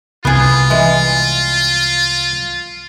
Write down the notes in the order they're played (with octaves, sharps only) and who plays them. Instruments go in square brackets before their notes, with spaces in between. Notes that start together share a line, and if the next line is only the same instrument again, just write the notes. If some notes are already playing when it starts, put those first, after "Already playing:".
[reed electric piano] C2 [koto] B3 G#4 [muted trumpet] F4
[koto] E3 G#3